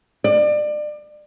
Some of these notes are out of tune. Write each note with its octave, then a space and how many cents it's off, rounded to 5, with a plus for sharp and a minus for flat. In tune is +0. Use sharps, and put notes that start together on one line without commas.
D5 +30